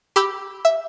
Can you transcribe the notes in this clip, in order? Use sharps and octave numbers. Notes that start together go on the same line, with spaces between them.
G4 B5 E6 G6
E5